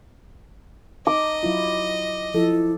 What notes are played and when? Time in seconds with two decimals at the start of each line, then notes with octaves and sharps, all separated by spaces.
1.07 D#4 D#5 D6
1.43 F#3 E4 F4
2.34 F3 E4 A4